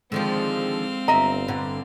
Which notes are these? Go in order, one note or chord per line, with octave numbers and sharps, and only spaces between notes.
D3 D#3 F3 G#3 C4 F5
G1 D#5 E5 A#5
G2 D3